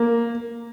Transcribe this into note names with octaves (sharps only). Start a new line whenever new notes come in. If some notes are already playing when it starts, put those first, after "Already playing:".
Already playing: A#3